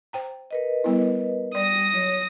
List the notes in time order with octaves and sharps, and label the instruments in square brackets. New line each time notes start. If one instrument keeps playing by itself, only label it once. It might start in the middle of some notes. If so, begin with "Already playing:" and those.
[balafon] C5 G5 A#5
[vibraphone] A#4 B4 D#5
[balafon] G3 B3 E4
[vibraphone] G3 [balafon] D5 [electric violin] D#6 A#6
[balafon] F#3 [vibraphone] C#5